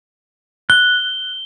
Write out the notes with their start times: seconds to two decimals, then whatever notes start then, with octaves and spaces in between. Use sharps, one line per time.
0.70 F#6 G7